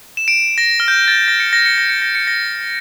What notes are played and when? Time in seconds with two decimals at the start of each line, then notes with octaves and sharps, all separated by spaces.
0.17 E7
0.28 D7
0.58 A#6
0.80 F6
0.88 G6
1.08 A6
1.28 A#6
1.40 C#7
1.53 A#6
1.66 C#7
1.78 A#6
1.90 C#7
2.02 A#6
2.15 C#7
2.27 A#6